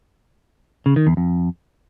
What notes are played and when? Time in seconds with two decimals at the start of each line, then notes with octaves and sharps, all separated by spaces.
0.86 C#3
0.96 D#3
1.07 E2
1.17 F2